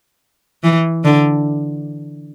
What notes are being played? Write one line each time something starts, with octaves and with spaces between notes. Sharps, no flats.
E3
D3